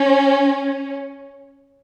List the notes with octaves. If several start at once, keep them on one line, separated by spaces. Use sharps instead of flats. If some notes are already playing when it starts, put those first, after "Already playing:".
Already playing: C#4